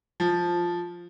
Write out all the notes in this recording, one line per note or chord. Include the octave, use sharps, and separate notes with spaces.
F3